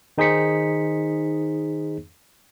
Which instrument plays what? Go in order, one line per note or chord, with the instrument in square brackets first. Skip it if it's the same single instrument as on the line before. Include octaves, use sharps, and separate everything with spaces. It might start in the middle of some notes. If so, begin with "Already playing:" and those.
[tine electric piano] D#3 D#4 G#4 C5 B6 C#7